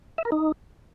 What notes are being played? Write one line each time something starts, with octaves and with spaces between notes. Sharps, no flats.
E5
A#4
D#4